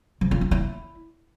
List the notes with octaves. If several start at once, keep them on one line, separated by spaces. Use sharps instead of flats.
F3
F4
C#4
E4